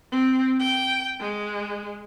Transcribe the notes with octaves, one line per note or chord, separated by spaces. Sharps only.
C4
G5
G#3